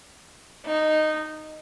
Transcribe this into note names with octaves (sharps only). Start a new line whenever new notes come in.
D#4